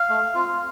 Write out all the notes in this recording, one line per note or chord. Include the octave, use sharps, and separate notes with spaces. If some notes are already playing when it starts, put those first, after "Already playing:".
Already playing: F5
A3
C4 F4